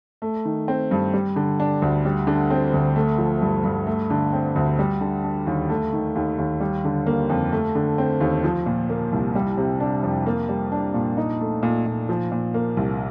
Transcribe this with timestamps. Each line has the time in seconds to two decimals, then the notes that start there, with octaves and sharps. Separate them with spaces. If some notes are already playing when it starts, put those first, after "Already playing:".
0.22 A3
0.45 D#3
0.68 C4
0.91 G2
1.14 G3
1.36 D3
1.60 D4
1.82 D2
2.05 G3
2.27 D3
2.50 C4
2.74 D2
2.96 A3
3.18 F3
3.42 G2
3.64 G2
3.87 A3
4.10 D3
4.33 C4
4.56 D2
4.79 G3
5.01 D3
5.24 D4
5.47 D#2
5.70 A3
5.93 D#3
6.16 D#2
6.38 D#2
6.60 G3
6.84 D3
7.07 A#3
7.30 F2
7.52 A3
7.75 D3
7.98 C4
8.21 D#2
8.44 F3
8.66 A#2
8.89 A#3
9.12 C2
9.35 G3
9.57 C3
9.80 D4
10.03 F2
10.26 A#3
10.49 G3
10.72 D4
10.94 A#2
11.17 D#4
11.41 A3
11.63 A#2
11.86 A#2
12.09 F3
12.32 A#2
12.54 A#3
12.77 C2